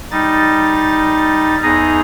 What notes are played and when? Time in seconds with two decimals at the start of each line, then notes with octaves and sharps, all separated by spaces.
0.11 G3 D#4 A6
1.63 E2 D#4 G#4 A#5